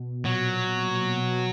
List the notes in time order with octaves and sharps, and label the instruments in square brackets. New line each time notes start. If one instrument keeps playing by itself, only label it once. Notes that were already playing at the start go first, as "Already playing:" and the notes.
Already playing: [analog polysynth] B2
[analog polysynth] A#2 [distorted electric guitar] F#3
[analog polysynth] B2